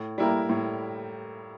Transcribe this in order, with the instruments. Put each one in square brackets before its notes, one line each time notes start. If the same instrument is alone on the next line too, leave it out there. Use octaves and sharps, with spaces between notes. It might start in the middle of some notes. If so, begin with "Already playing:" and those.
Already playing: [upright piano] A2
G3 A#3 E4 A#4
A2